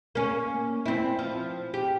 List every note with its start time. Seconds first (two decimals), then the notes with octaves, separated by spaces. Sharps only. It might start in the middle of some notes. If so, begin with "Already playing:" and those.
0.15 A#3 C#4
0.86 C4 E4
1.19 F3
1.74 G4